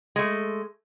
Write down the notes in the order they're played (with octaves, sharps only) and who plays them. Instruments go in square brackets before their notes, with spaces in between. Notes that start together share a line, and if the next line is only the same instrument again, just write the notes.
[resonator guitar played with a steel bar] G#3 A3